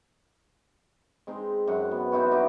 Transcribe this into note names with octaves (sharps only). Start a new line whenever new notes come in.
G#3 C4 D#4
F#2 F#5
B3
C4 D#4 E4 F#4
G3 D#4 F#4 G4